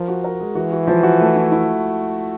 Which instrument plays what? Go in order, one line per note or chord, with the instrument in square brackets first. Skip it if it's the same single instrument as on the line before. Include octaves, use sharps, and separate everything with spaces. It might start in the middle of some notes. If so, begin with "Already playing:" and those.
Already playing: [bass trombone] F3 [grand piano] A#4
[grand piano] F#4
A#4
G#3
[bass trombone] E3 [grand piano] F#4
[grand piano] F#4
F3
F#4
A3
E4
E4